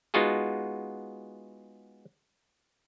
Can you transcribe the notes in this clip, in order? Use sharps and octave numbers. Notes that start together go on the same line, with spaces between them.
G#3 B3 D#4 F4 F#4 G#4